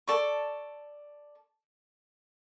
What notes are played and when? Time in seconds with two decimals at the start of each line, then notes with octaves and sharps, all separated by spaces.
0.08 A4 D5 A5 C#6